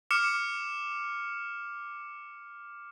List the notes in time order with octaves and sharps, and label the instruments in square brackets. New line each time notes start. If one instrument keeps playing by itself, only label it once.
[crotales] D6 F6 C#7 E7